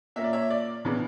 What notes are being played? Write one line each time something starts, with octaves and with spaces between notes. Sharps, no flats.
A#2 A#3 C#4 E5
D5
C#5 E5
D5
C#3 E3 B3 D4